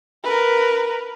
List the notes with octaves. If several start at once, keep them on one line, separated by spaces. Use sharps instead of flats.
A#4 B4